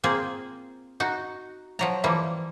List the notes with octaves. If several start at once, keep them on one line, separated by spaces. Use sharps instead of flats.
A#3 C4 F4 G#4
D#4 F#4
F3 F#3 A#5
E3 F3 G3 A#3